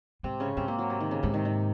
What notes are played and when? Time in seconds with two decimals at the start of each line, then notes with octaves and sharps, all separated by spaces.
0.23 G#2 C3 C4
0.40 C#3 C#4
0.57 G#2 C3 C4
0.68 A#3
0.78 F#3
0.90 C3
1.00 D#3
1.11 C#3
1.23 G#2 C3
1.34 D#3
1.45 D#3